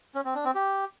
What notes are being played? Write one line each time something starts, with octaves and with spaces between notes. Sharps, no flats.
C#4
C4
D4
C4
G4